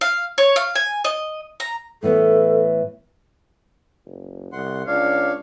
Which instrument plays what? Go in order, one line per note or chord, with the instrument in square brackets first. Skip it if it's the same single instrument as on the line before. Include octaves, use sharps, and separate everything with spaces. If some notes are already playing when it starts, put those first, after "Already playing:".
[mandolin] F5
C#5
F5
G#5
D#5
A#5
[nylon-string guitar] A2 E3 B3 [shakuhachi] A4
[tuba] F#1
[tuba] C2 [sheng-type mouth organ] F#5 C6
[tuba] C#2 [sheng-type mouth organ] D4 C#5 D5 [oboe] F5